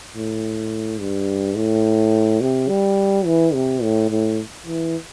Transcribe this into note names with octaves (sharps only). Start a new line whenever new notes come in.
A2
G2
A2
C3
G3
E3
C3
A2
A2
E3